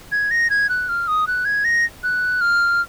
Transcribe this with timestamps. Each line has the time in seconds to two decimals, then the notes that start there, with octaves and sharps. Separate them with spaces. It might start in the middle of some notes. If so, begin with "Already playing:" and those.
0.12 G#6
0.31 A#6
0.50 G#6
0.69 F#6
0.89 F6
1.08 D#6
1.27 F#6
1.45 G#6
1.65 A#6
2.03 F#6
2.41 F6